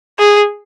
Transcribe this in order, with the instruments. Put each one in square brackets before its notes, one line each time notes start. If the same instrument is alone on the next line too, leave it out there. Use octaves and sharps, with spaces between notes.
[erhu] G#4